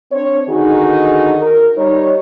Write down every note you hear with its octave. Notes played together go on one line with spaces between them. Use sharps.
C4 D4 C#5
D3 D#3 D#4 F#4 G#4
A#4
G3 D#4 C#5